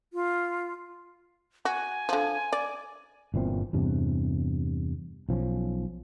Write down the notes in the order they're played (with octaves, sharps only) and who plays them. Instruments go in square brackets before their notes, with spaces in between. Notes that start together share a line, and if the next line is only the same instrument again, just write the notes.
[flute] F4
[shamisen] F#4 [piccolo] G#5
[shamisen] D3 F3
D5
[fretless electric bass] G1 A#2 E3 C4
E2 G2 C3
B1 F3 C#4